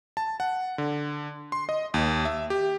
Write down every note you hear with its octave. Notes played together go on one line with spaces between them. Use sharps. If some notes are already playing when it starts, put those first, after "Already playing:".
A5
F#5
D3
C6
D#5
D#2
E5
G4